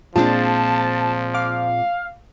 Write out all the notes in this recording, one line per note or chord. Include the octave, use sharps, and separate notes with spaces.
A#2 F3 G#3 C4 D4 F4 A5
F5 D6